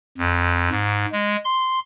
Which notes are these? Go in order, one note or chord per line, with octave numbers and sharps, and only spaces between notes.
F2
G#2
G#3
C6